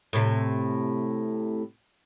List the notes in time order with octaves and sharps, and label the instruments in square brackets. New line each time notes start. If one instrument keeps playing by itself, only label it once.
[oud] A2 C3